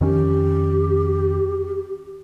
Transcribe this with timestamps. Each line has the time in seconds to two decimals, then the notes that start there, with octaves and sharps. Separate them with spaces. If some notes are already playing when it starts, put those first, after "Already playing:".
0.01 F2 D#3 C#4 G4